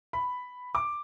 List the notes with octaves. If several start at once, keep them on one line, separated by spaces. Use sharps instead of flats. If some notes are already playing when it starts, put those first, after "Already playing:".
B5
D6